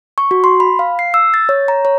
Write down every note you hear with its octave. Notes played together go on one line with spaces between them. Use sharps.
C#6
F#4
C6
B5
F5
C7
E6
A6
C#5
A#5
C#5